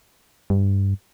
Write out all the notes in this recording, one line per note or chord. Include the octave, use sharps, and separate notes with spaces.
G2